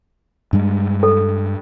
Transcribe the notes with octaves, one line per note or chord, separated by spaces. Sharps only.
G2 G3 G#3
A4